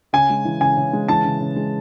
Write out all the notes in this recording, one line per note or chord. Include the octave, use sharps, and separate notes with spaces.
C#3 G#5
G#3
E3
C#3 G#5
C#3
G#3
E3 A5
C#3
C#3
G#3